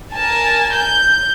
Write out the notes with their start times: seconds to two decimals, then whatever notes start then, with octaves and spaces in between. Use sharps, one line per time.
0.14 A#4 G#5 A5
0.77 G6